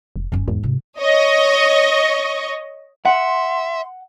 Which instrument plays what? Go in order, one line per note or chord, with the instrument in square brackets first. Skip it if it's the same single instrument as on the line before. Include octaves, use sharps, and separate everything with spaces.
[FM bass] F1
[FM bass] F1 [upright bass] F#2 C#4
[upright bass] E2 [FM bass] G#2
[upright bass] C3 F4
[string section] C#5 D#5 C#6
[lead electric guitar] E5 [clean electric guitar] F#5 [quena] C6